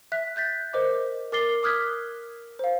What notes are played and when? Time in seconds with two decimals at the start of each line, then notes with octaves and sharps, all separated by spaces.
0.12 E5 F#6 B6
0.36 F#6 G6 A6 B6
0.73 A#4 C5 D#5 D6
1.32 A#4 D6 A6 C7 G7
1.63 D6 D#6 F6 F#6 G#6 B6
2.59 C5 F5